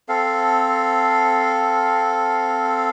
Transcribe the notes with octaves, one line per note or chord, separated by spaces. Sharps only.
C4 A4 F5